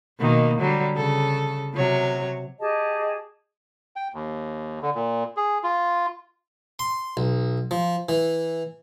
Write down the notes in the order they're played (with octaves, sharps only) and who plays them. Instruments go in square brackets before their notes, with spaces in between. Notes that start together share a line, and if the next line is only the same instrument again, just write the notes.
[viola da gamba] B2 D#3 A#3
D3 F#3 G3
C#3 A4
C3 F#3 C#5
[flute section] G4 G#4 D#5 A5
[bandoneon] G5
D#2
D3
A#2
G#4
F4
[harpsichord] C6
B1
F3
E3